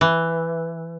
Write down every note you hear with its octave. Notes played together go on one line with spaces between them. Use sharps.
E3